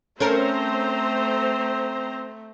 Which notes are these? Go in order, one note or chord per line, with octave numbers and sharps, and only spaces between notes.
A3 C4 C#4 A4 A#4 C5 A#5